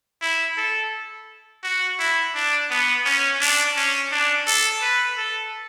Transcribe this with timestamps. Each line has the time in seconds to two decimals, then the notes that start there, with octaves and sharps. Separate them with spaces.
0.21 E4
0.57 A4
1.64 F#4
1.99 E4
2.34 D4
2.70 B3
3.05 C#4
3.41 D4
3.77 C#4
4.12 D4
4.47 A4
4.82 B4
5.17 A4